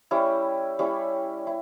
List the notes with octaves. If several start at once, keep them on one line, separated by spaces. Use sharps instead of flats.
G3 C#4 E4
G3 C#4 E4
E4